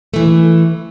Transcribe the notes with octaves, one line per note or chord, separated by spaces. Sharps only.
E3 A3